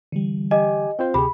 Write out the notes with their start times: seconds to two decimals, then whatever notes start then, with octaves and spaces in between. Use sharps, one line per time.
0.12 D3 E3 G3
0.51 G4 D#5 G#5
0.99 C4 F4 C5 G5
1.14 D2 C3 G4 G#4 B5